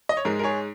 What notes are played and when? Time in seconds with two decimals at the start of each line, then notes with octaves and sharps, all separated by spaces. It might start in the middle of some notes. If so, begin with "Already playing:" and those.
0.09 D#5
0.17 C#5
0.25 G#2 G#3 A#4
0.39 A#4
0.43 G#4 C#5